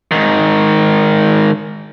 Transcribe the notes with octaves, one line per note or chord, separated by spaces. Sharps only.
G#2 D#3